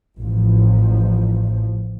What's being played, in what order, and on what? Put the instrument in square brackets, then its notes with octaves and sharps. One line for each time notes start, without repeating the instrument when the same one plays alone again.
[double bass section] A1 F3